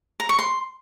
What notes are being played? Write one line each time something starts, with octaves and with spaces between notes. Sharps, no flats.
A#5
C#6
C6